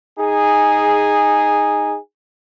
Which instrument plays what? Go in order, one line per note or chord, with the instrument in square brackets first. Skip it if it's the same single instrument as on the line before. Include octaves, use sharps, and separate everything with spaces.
[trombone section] D#4 G#4